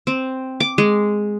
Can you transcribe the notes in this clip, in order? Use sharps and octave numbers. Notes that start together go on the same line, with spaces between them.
C4
D6
G#3